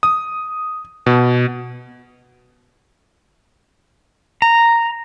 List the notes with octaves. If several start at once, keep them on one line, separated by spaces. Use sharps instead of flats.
D#6
B2
A#5